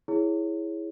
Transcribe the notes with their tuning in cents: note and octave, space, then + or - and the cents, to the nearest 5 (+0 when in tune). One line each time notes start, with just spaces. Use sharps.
E4 +0 G#4 +0 C#5 +0